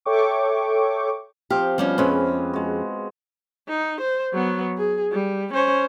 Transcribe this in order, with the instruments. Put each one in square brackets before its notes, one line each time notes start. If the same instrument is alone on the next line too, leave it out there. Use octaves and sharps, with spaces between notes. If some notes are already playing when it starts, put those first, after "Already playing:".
[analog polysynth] A4 C#5 E5 G5 C#6 D6
[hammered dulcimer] F3 C4 F5 [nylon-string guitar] G4
[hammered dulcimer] B2 D6 [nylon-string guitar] F3 G3 C#4
[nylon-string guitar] F2 C#4 [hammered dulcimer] G#3 C4 B4
[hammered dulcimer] G#3 F#4
[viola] D#4
C5
F#3 B3
G#4
G3
C#4 C5